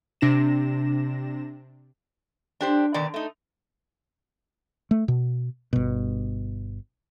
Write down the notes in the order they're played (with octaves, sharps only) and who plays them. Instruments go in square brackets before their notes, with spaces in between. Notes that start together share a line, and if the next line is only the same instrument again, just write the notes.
[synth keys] C3 D4 A#6 E7
[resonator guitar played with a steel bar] D4 G4 C5
B2 D3 D#3 D5
A3 D#4
[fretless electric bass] A3
B2
G1 B2